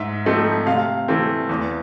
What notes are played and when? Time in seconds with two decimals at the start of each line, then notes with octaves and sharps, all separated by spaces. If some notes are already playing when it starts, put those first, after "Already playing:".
Already playing: G#2 E5
0.25 F3 A3 C4 D#4
0.67 C3 F5
1.08 E3 A3 C4
1.49 E2